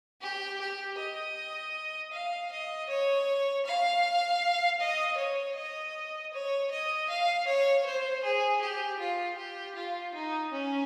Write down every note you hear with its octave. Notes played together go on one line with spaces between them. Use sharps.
G4
G4
D#5
F5
D#5
C#5
F5
D#5
C#5
D#5
C#5
D#5
F5
C#5
C5
G#4
G4
F4
G4
F4
D#4
C#4